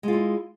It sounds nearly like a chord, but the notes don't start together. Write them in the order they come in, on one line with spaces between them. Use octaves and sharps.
G#3 F4 E4